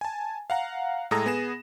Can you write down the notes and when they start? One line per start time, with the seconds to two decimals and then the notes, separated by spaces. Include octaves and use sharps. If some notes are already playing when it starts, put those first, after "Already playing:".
0.01 G#5 A5
0.50 F5 F#5 A#5
1.11 A2 G#3 A4 A#5 D#6 A#6
1.26 B3 G#4 A#6 E7